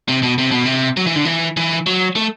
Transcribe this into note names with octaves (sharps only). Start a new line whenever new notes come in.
C3
B2
C3
B2
C3
F#3
E3
D3
E3
E3
F#3
A3